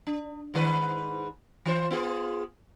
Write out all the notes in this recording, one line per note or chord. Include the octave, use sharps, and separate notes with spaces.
D4
G#2 D#3 B4
E3 F4 C5
B3 F4 G#4